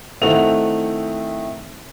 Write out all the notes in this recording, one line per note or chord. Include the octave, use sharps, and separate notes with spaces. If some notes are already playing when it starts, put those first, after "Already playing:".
D#3 A3 C4 E4 F#5 F7